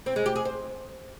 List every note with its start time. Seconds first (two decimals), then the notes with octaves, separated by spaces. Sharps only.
0.06 C4
0.16 G#3
0.26 G4
0.36 G#4
0.45 C5